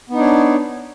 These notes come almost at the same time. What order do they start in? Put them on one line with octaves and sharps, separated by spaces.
B3 D#4 D4 C#5